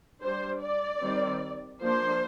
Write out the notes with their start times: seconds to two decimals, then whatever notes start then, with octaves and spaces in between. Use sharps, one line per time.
0.22 G3 D4 C5
0.61 D5
1.01 D#3 G3 C4
1.82 F3 A#3 D4 C5